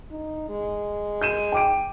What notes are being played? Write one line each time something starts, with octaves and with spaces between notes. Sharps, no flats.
D#4
G#3
G6 D#7 E7
G5 D6 D7